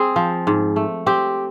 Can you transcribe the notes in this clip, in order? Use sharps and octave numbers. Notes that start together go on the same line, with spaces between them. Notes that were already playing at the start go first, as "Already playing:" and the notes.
Already playing: C4 G#4
F3
G#2
A3
C4 G4